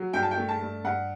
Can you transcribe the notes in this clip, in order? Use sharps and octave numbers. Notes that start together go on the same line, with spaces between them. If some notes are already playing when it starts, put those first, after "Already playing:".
Already playing: F#3
G2 G5
A5
G5
A3
A5
G2
G2 F#5